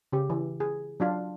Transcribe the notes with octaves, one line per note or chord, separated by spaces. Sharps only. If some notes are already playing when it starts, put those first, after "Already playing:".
C#3 G4
E3
G#4
F#3 D4 F4